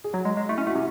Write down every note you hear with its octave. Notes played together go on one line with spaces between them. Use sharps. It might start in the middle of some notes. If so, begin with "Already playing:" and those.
G#4
F#3 F#4
G#3
G#3
A3 E4
C#4
A3 F#4
C3